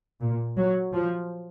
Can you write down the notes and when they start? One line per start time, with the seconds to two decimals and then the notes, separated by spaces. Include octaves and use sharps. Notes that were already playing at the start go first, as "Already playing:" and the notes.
0.21 A#2
0.57 F#3
0.93 F3